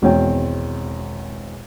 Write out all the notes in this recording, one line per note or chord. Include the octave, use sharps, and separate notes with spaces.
G#1 E2 B2 C4 C#5 G5